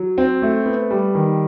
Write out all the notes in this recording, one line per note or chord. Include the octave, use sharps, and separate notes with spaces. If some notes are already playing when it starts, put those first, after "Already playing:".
Already playing: F#3
C4
A3
B3
G3
D#3